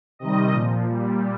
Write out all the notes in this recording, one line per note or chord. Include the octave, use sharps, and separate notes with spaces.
C3 D#3 G3 D#5
A#2 F3
A#2 G3